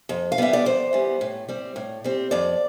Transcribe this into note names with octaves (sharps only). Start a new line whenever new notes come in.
F2
F5
E3 G3 B3 E5
D5
F2 C5
E3 G3 B3
A2
G3 C4
A2
G3 C4
F2 D5